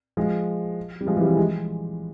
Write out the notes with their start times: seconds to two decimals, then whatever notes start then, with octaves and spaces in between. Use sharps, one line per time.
0.17 F3 G#3
1.01 G3
1.07 F3 G#3
1.17 E3 G3
1.28 E3
1.37 F3 G#3